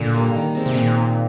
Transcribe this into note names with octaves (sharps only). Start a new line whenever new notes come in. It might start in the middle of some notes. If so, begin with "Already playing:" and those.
Already playing: A#2 D3
G3 A#3
D#3
G#3 C4
C3
A#2 D#3
G#3 C4